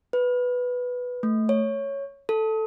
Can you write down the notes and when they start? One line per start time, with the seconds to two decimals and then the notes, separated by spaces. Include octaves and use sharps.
0.13 B4
1.23 A3
1.49 C#5
2.29 A4